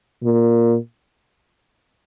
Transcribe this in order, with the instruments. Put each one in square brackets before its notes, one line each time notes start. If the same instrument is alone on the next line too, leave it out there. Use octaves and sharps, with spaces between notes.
[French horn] A#2